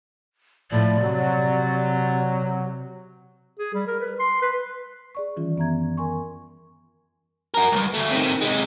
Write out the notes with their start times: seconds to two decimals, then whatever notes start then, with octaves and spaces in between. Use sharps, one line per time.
0.71 A2 F3 D5
1.02 C3 F#3
3.59 G#4
3.74 G3
3.87 A#4
4.00 B4
4.19 C6
4.42 B4
5.15 G#4 D5 C#6
5.37 D#3 E3 G3 C#4 F4
5.57 F#2 B3 E5 A#5 G#6
5.97 A#4 G#5 C6 C#6
7.54 F#4 A#4
7.73 C2 G2
7.94 D2 A3
8.11 C3 D#3
8.41 C3 G#3